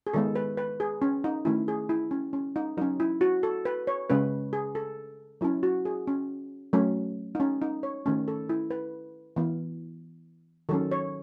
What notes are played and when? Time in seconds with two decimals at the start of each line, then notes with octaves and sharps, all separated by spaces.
0.07 G#4
0.13 D#3 G#3 B3 A4
0.36 B4
0.57 B4
0.80 G#4
1.02 C#4
1.24 D#4
1.45 D#3 A3 C#4 E4
1.68 G#4
1.89 E4
2.11 C#4
2.33 C#4
2.56 D#4
2.77 F#3 C#4 D#4
3.00 E4
3.21 F#4
3.43 A4
3.65 B4
3.87 C#5
4.10 C#3 G#3 C#4 B4
4.53 G#4
4.75 A4
5.41 F#3 C#4 E4
5.63 F#4
5.85 G#4
6.07 C#4
6.73 F#3 A3 C#4
7.35 D#4
7.40 C#4
7.62 D#4
7.83 C#5
8.06 D#3 A3 C#4
8.28 A4
8.49 E4
8.70 B4
9.36 E3 B3
10.69 D#3 F#3 C#4 A4
10.92 C#5